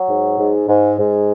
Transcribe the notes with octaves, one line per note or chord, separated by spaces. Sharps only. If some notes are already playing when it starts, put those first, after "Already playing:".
Already playing: F#3
G#2
G#2
G#2
G#2